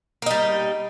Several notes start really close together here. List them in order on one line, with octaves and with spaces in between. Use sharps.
A#3 D#4 G3